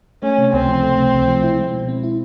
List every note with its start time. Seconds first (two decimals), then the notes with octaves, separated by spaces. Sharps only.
0.23 A3 C#4
0.38 C3
0.53 C#2 C4
0.68 F3
0.83 A3
0.98 C3
1.13 C#2
1.28 F3
1.43 E4
1.58 G#3
1.74 B2
1.88 C4
2.03 E4